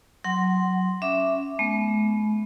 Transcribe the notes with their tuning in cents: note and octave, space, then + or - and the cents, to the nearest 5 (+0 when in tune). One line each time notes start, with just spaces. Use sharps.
F#3 +0 F#5 +20 C6 +0
C#4 +0 E5 +0 D6 +0
G#3 +45 B3 +0